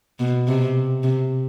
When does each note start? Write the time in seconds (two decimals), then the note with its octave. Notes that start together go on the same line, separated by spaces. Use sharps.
0.20 B2
0.47 C3
1.03 C3